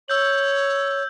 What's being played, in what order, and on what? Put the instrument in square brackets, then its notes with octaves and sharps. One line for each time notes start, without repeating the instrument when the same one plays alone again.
[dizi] C#5 [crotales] E6 G6 F#7